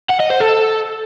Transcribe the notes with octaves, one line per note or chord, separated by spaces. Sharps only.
F#5
D#5
C5
A4